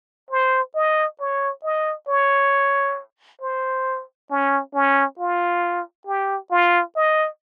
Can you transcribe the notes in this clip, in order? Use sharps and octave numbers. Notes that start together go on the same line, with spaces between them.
C5
D#5
C#5
D#5
C#5
C5
C#4
C#4
F4
G4
F4
D#5